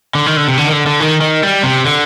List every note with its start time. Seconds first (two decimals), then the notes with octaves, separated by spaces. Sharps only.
0.15 D3
0.26 D#3
0.37 D3
0.48 C3
0.58 D3
0.67 D#3
0.72 D3
0.87 D3
1.00 D#3
1.21 D#3
1.43 G3
1.63 C3
1.85 D3